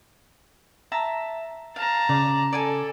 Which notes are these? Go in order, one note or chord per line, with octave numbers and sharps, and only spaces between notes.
E5 A5 A#5
F5 A5 A#5
C#3 D5
A4 D5 G#5 A5